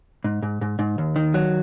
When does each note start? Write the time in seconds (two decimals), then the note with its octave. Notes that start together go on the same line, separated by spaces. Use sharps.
0.24 G#2
0.43 G#2
0.61 G#2
0.79 G#2
0.98 D#2
1.16 D#3
1.34 F#3